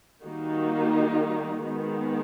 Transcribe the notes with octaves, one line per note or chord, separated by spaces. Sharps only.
D#3 G3 A#3 D#4 F#4
D#3 G#3 B3